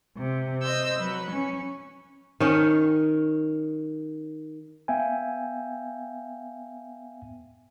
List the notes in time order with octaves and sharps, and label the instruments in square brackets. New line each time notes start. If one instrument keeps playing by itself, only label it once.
[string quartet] C3
C5 D#5 E6 G6
F#3 B4
C#4
[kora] D#3 C#4
[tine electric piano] B3 E5 F5 G5 G#5